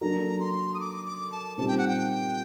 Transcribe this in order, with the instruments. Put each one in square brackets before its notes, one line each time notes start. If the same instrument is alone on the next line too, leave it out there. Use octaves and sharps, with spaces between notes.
[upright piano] F#3 A#3 D4 F#4 A4 [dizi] A#5
[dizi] C6
D#6
D6
D6
A5
[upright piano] A#2 G3 C4 D#4 G4 [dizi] A5
[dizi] G5
F#5
G5